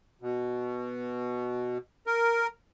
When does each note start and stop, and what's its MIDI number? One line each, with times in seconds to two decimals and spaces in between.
0.22 1.78 47
2.07 2.47 70